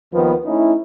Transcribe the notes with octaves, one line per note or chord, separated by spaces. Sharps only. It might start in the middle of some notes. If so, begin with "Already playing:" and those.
D#2 D#3 F3 B3
A3 C#4 D#4 E4